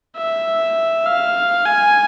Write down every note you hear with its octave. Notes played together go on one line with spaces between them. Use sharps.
E5
F5
G#5